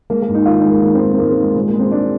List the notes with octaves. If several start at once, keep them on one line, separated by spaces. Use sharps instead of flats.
G#3 A#3
A#3
G#2
D#4
D#3 F4
D#4
G#3
A#3
D#3 A#3
C4
G#2
C4
G#2 A#3
C4
D#3
G#3
A#2 G#3
A#3
G#3
C4
G#3 D4